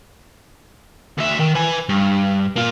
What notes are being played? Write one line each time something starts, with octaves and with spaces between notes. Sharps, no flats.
D2 E5
D#3
B4 G#5
G2
A#3 F4